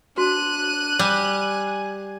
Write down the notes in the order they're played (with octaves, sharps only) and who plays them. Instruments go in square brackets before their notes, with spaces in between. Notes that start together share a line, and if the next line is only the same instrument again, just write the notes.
[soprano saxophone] D4 [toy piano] F#4 [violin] F#6 D#7
[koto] G3 [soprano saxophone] G#5